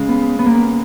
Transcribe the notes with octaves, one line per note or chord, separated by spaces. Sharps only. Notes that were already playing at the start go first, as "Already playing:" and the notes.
Already playing: C#3 G#3
B3
B3
A#3
B3